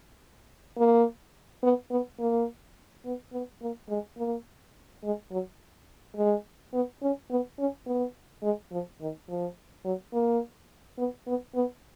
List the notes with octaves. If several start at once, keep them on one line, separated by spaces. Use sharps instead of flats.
A#3
B3
B3
A#3
B3
B3
A#3
G#3
A#3
G#3
F#3
G#3
B3
C#4
B3
C#4
B3
G#3
F3
D#3
F3
F#3
A#3
B3
B3
B3